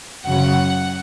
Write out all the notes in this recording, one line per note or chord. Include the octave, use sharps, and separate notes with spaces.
F#2 C#3 F#3 F#5